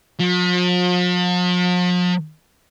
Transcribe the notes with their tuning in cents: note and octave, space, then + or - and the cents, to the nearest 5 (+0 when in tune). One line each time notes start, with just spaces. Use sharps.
F3 +45